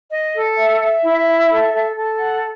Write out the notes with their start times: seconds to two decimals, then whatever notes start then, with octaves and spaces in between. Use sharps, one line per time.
0.12 D#5
0.34 A4
0.58 E5
0.81 E5
1.04 E4
1.27 E5
1.50 A4
1.73 A4
1.96 A4
2.19 F#5